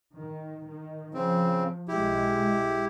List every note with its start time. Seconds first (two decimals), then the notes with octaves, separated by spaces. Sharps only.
0.15 D#3
0.66 D#3
1.14 C#3 F3 C4
1.88 B1 G#3 E4 G4